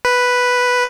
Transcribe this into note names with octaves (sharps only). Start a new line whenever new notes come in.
B4